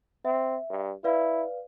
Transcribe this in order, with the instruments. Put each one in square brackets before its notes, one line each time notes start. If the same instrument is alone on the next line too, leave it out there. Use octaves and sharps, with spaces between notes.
[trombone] C4 [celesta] E5
[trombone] G2
[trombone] E4 [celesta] B4 D5 F5